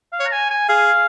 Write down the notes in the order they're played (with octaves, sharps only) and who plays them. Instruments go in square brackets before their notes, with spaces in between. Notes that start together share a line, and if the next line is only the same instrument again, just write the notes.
[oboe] F5
[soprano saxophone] C#5
[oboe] A#5
G#5
G#5
[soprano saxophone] G#4 [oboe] F5